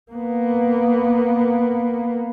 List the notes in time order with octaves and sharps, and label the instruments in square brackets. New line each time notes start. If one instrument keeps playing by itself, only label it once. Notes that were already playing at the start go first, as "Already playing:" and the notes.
[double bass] A#3 B3